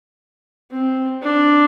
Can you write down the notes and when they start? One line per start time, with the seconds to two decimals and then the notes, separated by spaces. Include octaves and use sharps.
0.71 C4
1.22 D4